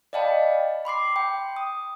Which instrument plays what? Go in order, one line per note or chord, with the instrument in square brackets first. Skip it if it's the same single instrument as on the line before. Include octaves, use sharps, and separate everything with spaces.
[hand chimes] D5 D#5 F5 G5 A5 B5
B5 C6 D6 C7
G5
D#6